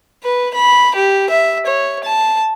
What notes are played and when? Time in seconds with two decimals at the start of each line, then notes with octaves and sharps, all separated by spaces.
0.23 B4
0.54 B5
0.95 G4
1.29 E5
1.66 C#5
2.04 A5